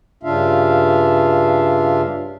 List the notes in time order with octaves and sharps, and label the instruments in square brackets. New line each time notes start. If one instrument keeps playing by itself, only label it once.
[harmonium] G2 C#3 D4 F4 E5 F5